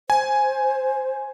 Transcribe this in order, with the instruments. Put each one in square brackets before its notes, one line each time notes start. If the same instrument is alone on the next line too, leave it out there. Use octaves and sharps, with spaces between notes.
[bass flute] C5 [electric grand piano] G#5